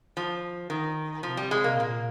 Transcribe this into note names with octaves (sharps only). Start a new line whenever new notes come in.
F3
D#3
C3 F3
G3
G#3
A#3
A#2 A#3